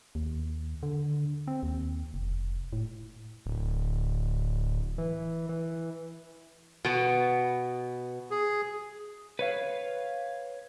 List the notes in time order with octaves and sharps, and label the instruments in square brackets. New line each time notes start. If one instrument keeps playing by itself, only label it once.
[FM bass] D#2
D3
C4
D#2
F1
A2
[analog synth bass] D1
E3
E3
[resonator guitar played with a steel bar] B2 B3
[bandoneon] G#4
[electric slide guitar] B4 C#5 F5